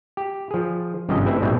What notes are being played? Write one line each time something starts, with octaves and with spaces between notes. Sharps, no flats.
G4
F3 G#4
G#1 G2 C3 F3 C#4 D#5
G3 A3 C4 E4 B4 E5
A#1 G#2 B2 G3 C4 E5